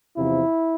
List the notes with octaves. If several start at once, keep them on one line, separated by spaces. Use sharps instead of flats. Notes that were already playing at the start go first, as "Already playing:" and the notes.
E2 C3 F3 E4